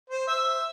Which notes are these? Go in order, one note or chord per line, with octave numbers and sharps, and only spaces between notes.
C5
E5